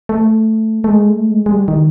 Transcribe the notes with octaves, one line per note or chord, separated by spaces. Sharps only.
A3
A3
G#3
A3
G#3
G#3
G3
D#3